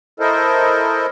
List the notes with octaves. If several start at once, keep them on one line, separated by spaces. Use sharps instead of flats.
E4 A4 A#4 C5 D#5